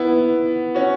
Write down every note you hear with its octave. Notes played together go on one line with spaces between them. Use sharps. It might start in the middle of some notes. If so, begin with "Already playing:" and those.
Already playing: B3 E4
C#4 F#4